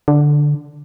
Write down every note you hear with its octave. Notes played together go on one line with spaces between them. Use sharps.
D3